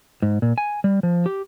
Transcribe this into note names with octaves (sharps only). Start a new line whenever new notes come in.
G#2
A#2
G#5
G3
F3
G4